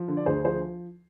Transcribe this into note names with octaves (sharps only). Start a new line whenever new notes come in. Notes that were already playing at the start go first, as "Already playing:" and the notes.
Already playing: F3
D3
D5
D2 G#4 C5
F3 G#4 C5